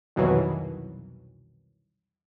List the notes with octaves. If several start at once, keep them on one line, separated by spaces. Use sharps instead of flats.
C2 F2 B2 D#3 E3 F#3